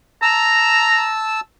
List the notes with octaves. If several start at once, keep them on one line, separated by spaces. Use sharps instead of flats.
A5 A#5 E6